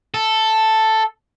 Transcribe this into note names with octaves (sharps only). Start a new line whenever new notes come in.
A4